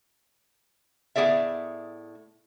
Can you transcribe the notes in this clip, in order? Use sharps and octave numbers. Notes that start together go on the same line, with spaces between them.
A2 B3 G#4 D5 E5